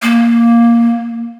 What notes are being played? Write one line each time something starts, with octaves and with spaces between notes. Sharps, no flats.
A#3